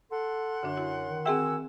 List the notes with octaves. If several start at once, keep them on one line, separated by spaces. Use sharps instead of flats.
A4 F#5 C6
F#2 D3 D4
E4 F#4
D#3
C4 F#4 G#4 G5 G#5 E6